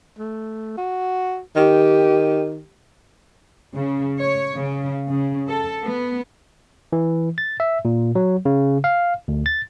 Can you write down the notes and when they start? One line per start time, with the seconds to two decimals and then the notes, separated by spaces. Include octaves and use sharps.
0.19 A3
0.78 F#4
1.56 D#3 G4
3.74 C#3
4.19 C#5
4.56 C#3
5.09 C#3
5.48 A4
5.82 B3
6.93 E3
7.38 A6
7.60 E5
7.85 A#2
8.15 F#3
8.45 C#3
8.84 F5
9.28 D2
9.46 A6